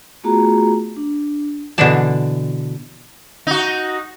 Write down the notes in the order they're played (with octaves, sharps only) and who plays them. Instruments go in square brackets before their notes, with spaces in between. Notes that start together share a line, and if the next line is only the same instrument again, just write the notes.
[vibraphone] A3 B3 F4 F#4 G#4 A#5
D4
[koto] B2 D3 E3 D4 D5 A5
[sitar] D#4 F#4